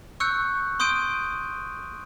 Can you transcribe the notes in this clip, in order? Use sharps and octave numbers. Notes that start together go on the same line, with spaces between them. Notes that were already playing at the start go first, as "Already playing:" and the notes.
C#6 E6 F#6 G6 C#7
C6 D#6 G6 D7 D#7 G7